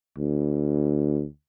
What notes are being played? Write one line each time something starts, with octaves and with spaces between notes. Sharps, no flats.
D2